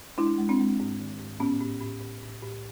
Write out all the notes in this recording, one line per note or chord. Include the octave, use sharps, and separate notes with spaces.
G#3 D4 E4
G#3
C4 D4
G#3
G#2
D#3
G#2
A2 B3 C#4
A2
A2
A2
A2
A2